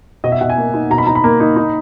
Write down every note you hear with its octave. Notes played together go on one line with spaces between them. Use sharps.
B2 D#5
E5
B2 F#5
G#5
A#3
D#4
B2 A#5
B5
D#4 A#5
B5
A#3 A#5
D#4
D#4